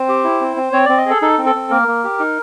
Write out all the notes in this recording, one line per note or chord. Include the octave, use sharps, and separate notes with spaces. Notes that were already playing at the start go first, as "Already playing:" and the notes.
Already playing: C4 C5
G4
E4
C4
C4
C4 C#5
C4 D5
D#5
G#4 A4
D#4 A4
C4
A4
C4
A#3 A#4
A#3
G4
D#4